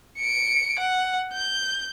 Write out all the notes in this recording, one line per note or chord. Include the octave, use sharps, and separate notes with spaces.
C#7 D7
F#5
G6